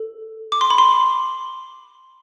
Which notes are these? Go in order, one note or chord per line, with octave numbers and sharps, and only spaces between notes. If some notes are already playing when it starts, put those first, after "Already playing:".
Already playing: A4
D6
C6
B5
C6